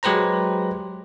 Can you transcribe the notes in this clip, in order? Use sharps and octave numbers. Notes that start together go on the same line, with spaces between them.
F#3 G#3 G4 B4 C5 A#5